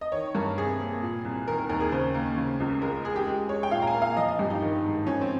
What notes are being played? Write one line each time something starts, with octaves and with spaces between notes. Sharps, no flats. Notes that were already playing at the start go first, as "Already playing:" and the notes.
D#5
D#3 C#5
G2 A#4
C3 G#4
A#3
A#2
C2
D#3 A#4
A#4
D#2 A#4
G#4
C#3 C5
A#3 A#4
C#3
C#2
G#3 A#4
G#3 G#4
G4
G#3
G#3 C#5
G5
A#2 F5
A#5
G#5
A#3
F5
F3 D#5
D#5
G2 G4
D#4
D#3
G#2
F3 C#4
C4